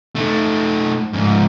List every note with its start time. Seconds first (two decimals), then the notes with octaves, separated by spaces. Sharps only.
0.15 A3 D#4
1.13 G#2 F3